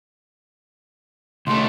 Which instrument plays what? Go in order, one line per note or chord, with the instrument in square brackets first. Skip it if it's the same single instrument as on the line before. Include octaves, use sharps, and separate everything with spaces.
[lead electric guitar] C2 A3 [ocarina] C6